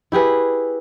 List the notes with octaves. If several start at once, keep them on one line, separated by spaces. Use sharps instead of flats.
E4 G4 G#4 B4